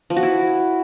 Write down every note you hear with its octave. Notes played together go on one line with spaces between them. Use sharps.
F3
F#4
E4